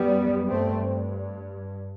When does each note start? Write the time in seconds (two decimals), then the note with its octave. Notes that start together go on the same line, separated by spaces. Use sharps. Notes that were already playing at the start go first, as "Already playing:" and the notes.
Already playing: F#2 G3 B3
0.49 G2 A3 C4